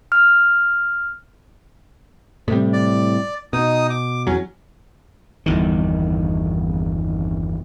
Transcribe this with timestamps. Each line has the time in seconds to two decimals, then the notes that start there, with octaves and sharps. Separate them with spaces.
0.12 F6
2.48 A2 C3 G3
2.73 D5
3.53 B2 D#4 D#6
3.90 D6
4.27 E2 F#3 C#4
5.46 G1 E2 D#3